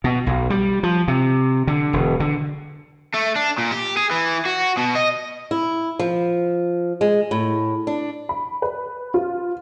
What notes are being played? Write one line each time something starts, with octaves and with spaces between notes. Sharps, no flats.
B2
B1
G3
F3
C3
D3
E1
D3
A3
D4
A#2
G4
G#4
E3
F#4
B2
D#5
E4
F3
G#3
A2
D4
B5
B4
F4